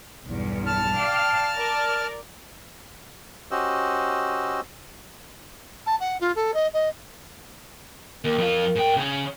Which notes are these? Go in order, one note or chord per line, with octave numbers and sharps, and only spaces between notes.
B1 E2 G2
A5 F6
D5 F5 G5
A#4 D5
C#4 F#4 G4 C5 D#5 E6
A5
F#5
F4
A4
D#5
D#5
D#2 A#4
F2 F4
G#2 G5
C#3 C#4